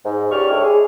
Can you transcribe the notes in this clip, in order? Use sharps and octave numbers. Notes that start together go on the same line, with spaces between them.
G#2
C#2 G4 C#5 D5 C#6 F6
A3 D4 E4 A4 C#5 G5
G#4